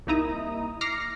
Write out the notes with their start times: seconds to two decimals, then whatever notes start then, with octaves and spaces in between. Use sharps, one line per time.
0.07 C2 A#3 D#4 E4 A#5 D#6
0.81 D6 F6 A#6 C7 C#7